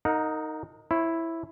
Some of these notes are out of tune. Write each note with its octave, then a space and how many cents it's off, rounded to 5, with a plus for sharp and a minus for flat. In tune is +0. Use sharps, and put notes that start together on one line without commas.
D#4 +0 A#4 -30 F#5 -40
E4 +0 C#5 -45